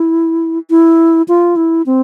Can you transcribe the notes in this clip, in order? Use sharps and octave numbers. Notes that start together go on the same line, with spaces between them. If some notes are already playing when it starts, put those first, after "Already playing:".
Already playing: E4
E4
F4
E4
C4